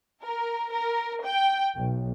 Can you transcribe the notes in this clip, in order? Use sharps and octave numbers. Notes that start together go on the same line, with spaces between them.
A#4
A#4
G5
B1